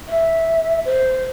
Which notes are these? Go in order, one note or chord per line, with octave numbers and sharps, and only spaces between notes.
E5
C5